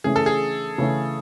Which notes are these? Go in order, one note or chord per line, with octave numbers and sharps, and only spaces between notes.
C#3 E3 A3 C#4 G#4
A4
G#4
C#3 E3 A3 C#4